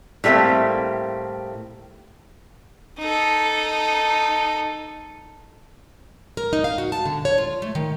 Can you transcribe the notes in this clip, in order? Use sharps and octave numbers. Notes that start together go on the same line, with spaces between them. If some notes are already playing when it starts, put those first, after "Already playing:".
A2 G3 A3 A#3 C4
D#4 A4
A#4
D#4
F5
F#4
A5
D3
C#5
F4
A3
D#3